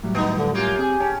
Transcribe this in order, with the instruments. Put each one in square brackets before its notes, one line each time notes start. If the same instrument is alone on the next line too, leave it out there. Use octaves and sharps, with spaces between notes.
[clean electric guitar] A2 F#3 G3
[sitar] D#3 B3 [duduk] D#4
[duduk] D3
[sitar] F#2 A#3 F4 [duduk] G4
[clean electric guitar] C4 [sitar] G#4
[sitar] C#4 [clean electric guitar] G5 A5